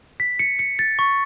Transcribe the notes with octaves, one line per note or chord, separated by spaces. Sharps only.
B6
C#7
C#7
A6
C#6